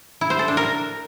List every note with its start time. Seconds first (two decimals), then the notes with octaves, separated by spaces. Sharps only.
0.21 E4
0.30 C5
0.39 A4
0.48 D4
0.57 A#4